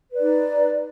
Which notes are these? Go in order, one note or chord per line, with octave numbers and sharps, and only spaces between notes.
D#4 B4 D5